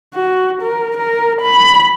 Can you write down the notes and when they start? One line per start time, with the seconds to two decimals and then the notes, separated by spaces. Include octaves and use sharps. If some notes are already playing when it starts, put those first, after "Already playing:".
0.15 F#4
0.62 A#4
0.98 A#4
1.42 B5